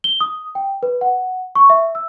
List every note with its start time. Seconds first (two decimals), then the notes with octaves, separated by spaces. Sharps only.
0.04 G7
0.21 D#6
0.55 G5
0.83 B4
1.01 F#5
1.55 C#6
1.70 E5
1.95 E6